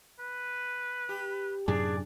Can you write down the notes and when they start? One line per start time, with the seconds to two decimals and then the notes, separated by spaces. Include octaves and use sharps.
0.20 B4
1.09 G4
1.68 F#2 A2 C3 D4 G#4 D5